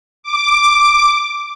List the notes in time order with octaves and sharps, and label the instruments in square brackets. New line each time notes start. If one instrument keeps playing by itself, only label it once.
[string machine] D6